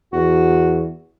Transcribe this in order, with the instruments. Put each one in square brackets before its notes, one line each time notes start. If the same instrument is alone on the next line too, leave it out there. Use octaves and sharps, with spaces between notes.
[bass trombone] E2 [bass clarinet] F#4